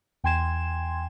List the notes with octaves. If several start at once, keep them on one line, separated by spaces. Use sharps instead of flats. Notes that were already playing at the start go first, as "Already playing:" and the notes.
E2 G5 G#5 C6 G#6 E7